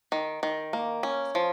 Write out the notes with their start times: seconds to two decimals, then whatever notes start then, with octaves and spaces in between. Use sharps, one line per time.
0.12 D#3
0.43 D#3
0.73 A#3
1.03 C#4
1.35 F3